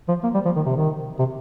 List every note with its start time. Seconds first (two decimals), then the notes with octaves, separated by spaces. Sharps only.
0.08 F3
0.23 A#3
0.34 G3
0.45 F3
0.56 D#3
0.66 C3
0.76 D#3
1.19 C3